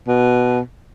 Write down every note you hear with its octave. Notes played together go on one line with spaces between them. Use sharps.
B2